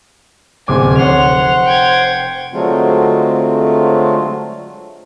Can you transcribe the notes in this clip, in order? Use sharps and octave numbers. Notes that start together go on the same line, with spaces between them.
D1 C3 C5 G#5 D6
F1 C#5 F#5 C6 F7
G5 G#6
D3 F#3 G#3 A3 C4 F4